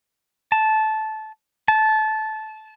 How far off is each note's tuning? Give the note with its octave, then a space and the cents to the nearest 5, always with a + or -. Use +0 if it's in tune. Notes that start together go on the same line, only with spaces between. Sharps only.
A5 -15
A5 -20